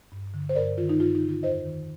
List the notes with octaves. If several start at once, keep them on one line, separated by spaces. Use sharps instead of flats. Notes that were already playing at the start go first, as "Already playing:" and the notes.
G2
D3
C5
G2 A#4 D5
D#3 F4
D#4
G2 F4
D#4
D3
F4
F2 C5 D#5
D#3